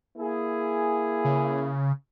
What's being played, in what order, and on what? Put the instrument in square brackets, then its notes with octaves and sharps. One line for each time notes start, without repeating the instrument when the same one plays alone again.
[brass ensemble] A#3 E4 G#4
[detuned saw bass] C#3